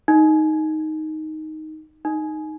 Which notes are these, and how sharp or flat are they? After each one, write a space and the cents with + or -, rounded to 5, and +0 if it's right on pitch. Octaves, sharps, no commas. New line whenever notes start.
D#4 +5
D#4 -5